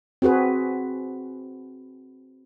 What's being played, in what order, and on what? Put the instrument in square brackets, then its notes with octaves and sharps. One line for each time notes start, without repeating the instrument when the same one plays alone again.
[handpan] C4 F#4 G#4 B4